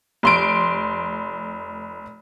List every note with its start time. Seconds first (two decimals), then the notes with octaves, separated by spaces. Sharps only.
0.23 F1 C6 D7